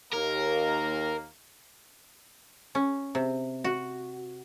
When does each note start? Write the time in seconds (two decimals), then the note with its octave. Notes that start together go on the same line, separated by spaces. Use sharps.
0.13 D#2 A#3 A#4
2.75 C#4
3.15 C3
3.64 F#4